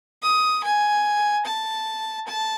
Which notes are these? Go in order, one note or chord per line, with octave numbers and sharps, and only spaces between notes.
D#6
G#5
A5
A5